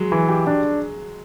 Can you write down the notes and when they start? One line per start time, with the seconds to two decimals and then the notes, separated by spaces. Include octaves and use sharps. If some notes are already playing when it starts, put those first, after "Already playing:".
Already playing: F#3 G#3
0.12 E3
0.29 G4
0.47 D4